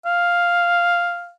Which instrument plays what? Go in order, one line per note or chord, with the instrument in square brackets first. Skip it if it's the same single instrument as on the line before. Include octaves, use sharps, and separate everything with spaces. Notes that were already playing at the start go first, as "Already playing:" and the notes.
[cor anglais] F5